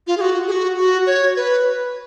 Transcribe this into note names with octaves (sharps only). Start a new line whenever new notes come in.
F4
G#4
F#4
G#4
F#4
F#4
C#5
B4